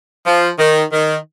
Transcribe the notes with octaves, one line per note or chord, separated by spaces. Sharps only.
F3
D#3
D#3